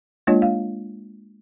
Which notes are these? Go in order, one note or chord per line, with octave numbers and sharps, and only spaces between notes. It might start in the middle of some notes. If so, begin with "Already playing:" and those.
G#3 A#3 D4 F4 C#5 D#5
F5